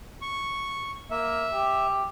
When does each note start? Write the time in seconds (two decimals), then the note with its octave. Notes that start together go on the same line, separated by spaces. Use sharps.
0.22 C#6
1.11 A#3 E5
1.53 G4